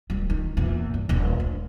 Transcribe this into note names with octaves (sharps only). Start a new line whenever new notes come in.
D1 G3
D#3
E2 A#2
G2
D#1 D4
D2